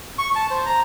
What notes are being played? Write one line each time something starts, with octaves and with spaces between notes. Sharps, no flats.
C#6
A5
C5
A#5